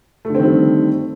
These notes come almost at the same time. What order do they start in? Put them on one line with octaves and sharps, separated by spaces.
A3 D3 C4 D#3 G3